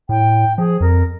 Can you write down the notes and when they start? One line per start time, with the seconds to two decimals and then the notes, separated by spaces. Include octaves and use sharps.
0.09 A2 G5
0.58 F3 G#4
0.81 F2 A#4